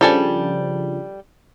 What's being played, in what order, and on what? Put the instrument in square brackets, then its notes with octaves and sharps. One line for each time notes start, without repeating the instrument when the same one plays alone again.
[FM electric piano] C#3 F3 D4 [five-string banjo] G3 A4 G#5